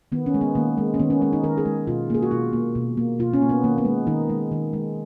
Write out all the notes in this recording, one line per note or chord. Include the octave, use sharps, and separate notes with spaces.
D#3 B3
C#4
G#3
B3
D#3 A#3
G#3
C#4
D#3 B3
C#4
G#3 C#4
D#4
D#3 A#4
G#4
G#3
B2 F4
A#3 G#4
F#4
B2 F4
A#3
B2
A#3
B2 F4
C#4
A#3
B3
D#3 A#3
B3
G#3
D#3 D#4
G#3
D#3
G#3